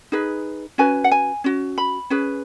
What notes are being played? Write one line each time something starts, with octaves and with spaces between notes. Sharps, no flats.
D#4 G#4 B4
C#4 F#4 B4 G#5
F#5
G#5
C#4 F#4
B5
C#4 G#4 B4